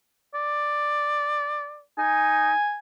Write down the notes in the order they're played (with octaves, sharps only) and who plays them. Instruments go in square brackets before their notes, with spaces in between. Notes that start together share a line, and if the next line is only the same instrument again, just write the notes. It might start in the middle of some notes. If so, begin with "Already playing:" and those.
[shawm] D5
[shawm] D#4 [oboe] G#5